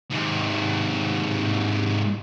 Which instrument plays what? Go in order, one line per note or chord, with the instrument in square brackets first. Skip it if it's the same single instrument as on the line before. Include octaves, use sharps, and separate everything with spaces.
[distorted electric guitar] G#2 C3